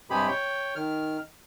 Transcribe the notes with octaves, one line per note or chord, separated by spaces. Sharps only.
G2 C3 G#3 G4 G#4 B5
C#5 G5
D#3 F6